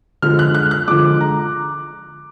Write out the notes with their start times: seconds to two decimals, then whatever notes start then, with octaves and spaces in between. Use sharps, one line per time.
0.22 D3 F3 G#3 F6
0.39 F#6
0.55 F#6
0.71 F#6
0.87 D3 F3 G#3 D6
1.21 A#5